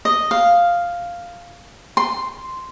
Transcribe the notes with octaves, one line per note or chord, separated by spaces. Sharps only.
D#5
F5
C6